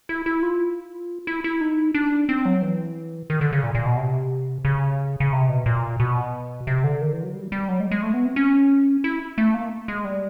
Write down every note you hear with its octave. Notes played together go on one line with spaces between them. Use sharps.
E4
E4
F4
E4
E4
D#4
D4
C4
F#3
E3
D#3
D3
C#3
A#2
A#2
B2
C3
C#3
C#3
C3
B2
A#2
B2
C3
D3
D#3
E3
F#3
G3
G3
F#3
G#3
G#3
A3
B3
C4
C#4
E4
A3
A#3
G#3
G3